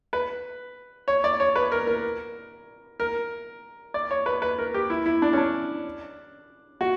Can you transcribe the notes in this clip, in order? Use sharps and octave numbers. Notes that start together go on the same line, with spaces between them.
B4
C#5
D5
C#5
B4
A#4
A#4
A#4
D5
C#5
B4
B4
A#4
G4
E4
E4
D4
C#4
D4
F#4